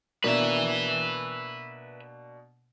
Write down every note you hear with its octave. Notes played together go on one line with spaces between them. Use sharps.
B2 A#3 D4 B4 E5